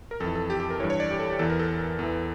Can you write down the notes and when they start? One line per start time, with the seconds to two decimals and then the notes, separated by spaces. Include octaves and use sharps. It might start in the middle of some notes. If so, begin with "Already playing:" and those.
0.11 A#4
0.20 F2 E3 A4
0.35 A4
0.50 G4
0.60 G4
0.70 A#4
0.80 E3 C#5
0.84 G2
0.90 C#5
1.00 D5
1.10 G4
1.20 A4
1.30 G4
1.39 E2 E3 A4
1.50 A#4
1.59 A4
1.99 E2 E3